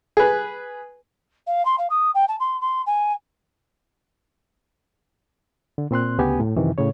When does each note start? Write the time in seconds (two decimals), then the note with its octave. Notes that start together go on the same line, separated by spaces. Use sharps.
0.17 G#4 B4
1.46 F5
1.65 C6
1.78 F5
1.89 D#6
2.14 G5
2.28 A5
2.39 C6
2.60 C6
2.86 G#5
5.78 D3
5.91 A#2 C4 C6 F#6
6.18 D2 C#3 B3 G4 G#5
6.40 A2
6.56 F#2 C3 D#3 E3
6.78 A2 C#3 C#5